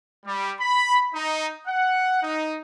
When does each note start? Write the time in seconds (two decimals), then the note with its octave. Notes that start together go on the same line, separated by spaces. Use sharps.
0.25 G3
0.60 B5
1.14 D#4
1.66 F#5
2.23 D#4